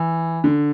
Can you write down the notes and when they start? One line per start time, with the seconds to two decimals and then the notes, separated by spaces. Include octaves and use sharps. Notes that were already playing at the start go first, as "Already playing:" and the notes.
Already playing: E3
0.44 D3